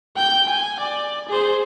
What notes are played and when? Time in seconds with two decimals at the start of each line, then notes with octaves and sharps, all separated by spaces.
0.16 G5 G6
0.47 G#5
0.79 D5
1.28 G#4 C5